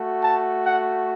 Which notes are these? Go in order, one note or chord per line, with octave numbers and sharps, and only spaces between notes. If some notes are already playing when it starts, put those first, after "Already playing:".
Already playing: A3 F#4
A5
F#5